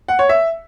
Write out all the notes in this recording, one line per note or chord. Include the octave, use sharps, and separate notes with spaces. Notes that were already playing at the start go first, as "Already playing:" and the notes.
F#5
C#5
E5